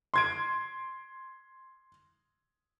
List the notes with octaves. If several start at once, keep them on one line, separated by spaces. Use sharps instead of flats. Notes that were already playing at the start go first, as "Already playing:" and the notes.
C6 G#6 D7